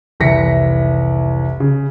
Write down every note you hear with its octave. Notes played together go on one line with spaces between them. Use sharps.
F1 C2 E3 A#6 B6 C#7
C#3